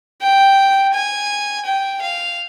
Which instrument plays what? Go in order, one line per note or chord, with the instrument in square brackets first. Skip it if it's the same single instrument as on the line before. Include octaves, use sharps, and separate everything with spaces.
[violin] G5
G#5
G5
F5